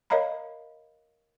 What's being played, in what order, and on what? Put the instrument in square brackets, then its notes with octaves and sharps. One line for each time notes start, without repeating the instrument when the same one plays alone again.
[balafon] A#4 C#5 D#5 F5 A#5 B5